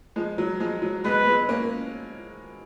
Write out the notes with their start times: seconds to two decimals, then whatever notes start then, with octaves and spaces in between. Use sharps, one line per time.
0.16 F3 G#3
0.38 F#3
0.60 F3 G#3
0.82 F#3
1.05 G#3 B3 B4
1.27 G#3 B3
1.49 A#3 C#4